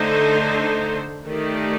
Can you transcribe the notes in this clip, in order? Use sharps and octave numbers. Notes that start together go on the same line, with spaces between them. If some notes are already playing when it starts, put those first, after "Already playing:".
Already playing: D3 A3 D#4 A4 C5
D#3 A3 D#4 G4 D5